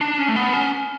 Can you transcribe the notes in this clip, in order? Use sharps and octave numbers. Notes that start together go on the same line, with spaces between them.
D4
C#4
A3
B3
C#4